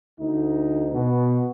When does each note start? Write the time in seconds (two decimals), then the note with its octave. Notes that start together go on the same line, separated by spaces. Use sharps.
0.19 D2 D#4
0.93 B2